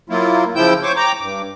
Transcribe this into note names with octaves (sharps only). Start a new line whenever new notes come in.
F#3 A#3 E4 F4
C#3 F3 E4 G5 E6 G6
C5 C#5 C#6 D6
G5 A#5 D6
G2 D6